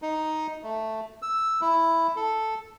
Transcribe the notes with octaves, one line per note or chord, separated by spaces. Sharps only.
D#4
A3
E6
E4
A4